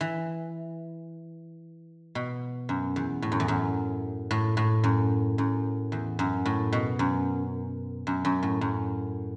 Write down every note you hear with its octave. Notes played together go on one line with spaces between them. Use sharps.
E3
B2
F#2
E2
A2
F#2
E2
F#2
A2
A2
F#2
F#2
E2
F#2
A2
B2
F#2
F#2
F#2
A2
F#2